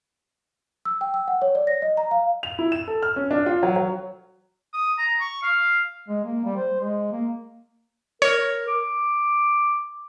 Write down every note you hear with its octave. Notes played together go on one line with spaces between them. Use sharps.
E6
G5
E6
F#5
C#5
D5
A#6
D#5
A#5
F5
F7
E4
E7
A4
F6
C#4
D4
F4
F#3
F#3
D#6
A#5
C#6
F5
G#3
A#3
G3
C5
G#3
A#3
A#4 C#5
D6